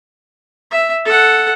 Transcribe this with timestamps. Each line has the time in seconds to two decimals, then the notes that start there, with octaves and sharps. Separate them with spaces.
0.71 E5
1.05 A4 F#5